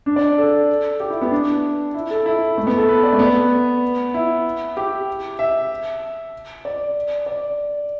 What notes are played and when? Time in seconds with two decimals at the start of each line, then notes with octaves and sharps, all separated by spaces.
0.06 D4
0.16 D5
0.38 A4
1.00 G4
1.10 E4
1.21 B3
1.31 D4
1.94 E4
2.10 A4
2.26 E4
2.58 A3
2.67 B3
2.78 A4
2.89 B4
3.03 D5
3.13 A3
3.19 B3
4.14 E4
4.77 G4
5.39 E5
6.65 D5
7.26 D5